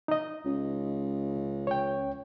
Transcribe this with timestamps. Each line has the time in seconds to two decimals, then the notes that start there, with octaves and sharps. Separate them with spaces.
0.08 D#4 D#5
0.45 C#2
1.67 C#5 G5